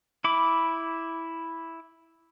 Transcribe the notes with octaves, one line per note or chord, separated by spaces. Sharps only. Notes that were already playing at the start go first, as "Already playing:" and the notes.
E4 B5 D6